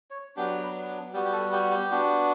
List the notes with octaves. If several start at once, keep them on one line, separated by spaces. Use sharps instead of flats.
C#5
F#3 B3 D4 G4
B4
G3 B3 F#4 G4
G4
A4
G4
G4
B3 D4 F#4